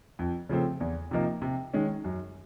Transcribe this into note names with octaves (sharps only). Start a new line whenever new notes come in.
F2
C#3 F3 A3 C4
E2
C3 F3 A#3 D#4
C3
D#3 G#3 C#4
F#2